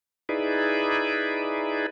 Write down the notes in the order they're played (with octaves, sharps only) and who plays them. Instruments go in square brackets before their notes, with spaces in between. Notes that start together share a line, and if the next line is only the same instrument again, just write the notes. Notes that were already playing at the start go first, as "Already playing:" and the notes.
[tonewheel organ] D#4 E4 G#4 B4 D5